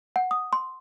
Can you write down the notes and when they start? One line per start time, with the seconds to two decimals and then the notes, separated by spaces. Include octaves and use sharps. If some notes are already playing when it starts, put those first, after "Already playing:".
0.16 F#5
0.31 D#6
0.53 C6